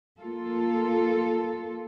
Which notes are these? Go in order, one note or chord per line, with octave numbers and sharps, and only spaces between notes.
A#3 F4 A4